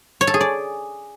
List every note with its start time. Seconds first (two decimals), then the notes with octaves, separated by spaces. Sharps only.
0.21 C#5
0.27 A4
0.34 G#4
0.41 D5